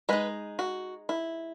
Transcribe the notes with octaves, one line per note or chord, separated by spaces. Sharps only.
G#3 D#4 B4
F#4
E4